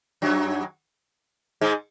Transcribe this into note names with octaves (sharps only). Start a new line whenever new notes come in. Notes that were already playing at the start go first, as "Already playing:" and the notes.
F#2 F#3
G#2 G#3